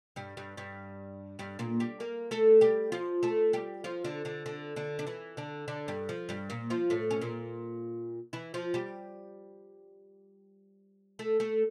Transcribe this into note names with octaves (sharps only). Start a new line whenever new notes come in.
G2 G3
G2 G3
G2 G3
G2 G3
A#2 A#3
G3 G4
A#3 A#4
A3 A4
G3 G4
F3 F4
A3 A4
G3 G4
F3 F4
D3 D4
D3 D4
D3 D4
D3 D4
D4
E3 E4
D3 D4
D3 D4
G2 G3
F3
G2 G3
A#2 A#3
F3 F4
A2 A3
C#4
A#2 A#3
E3 E4
F3 F4
G3 G4
A3 A4
A3 A4